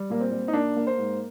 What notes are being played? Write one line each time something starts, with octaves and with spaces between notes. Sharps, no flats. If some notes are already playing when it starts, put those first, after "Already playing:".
Already playing: G3
A#2 A#3
C4
A#2
D#4
A#3 D4
A#3
C5
G#2